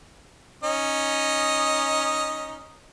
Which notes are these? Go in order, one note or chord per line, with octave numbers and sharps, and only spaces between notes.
C#4 D#4 D#5